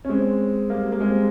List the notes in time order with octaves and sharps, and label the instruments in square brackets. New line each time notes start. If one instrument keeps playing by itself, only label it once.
[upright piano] C#4
G#3 C4
G3 A#3
A#3
G#3 C4